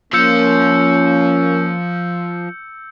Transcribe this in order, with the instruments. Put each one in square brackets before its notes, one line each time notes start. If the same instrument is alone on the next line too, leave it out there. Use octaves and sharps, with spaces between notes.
[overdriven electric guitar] F3 [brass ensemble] A#3 C#4 [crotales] E6 G6 C#7